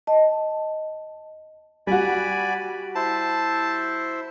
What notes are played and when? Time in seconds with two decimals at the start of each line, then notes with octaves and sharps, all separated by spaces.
0.07 D#5 A5
1.87 G3 F#4 D5 G#5 B5
2.96 E4 C5 A5